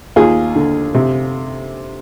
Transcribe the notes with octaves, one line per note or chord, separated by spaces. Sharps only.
D#2 F4 G#4
D3
C3